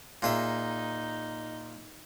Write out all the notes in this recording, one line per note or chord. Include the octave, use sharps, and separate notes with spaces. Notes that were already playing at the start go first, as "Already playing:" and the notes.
A#2 D#4 G#4 E5